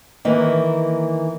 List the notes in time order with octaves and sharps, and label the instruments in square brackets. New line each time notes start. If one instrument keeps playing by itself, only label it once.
[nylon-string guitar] D#3 E3 A#3 B4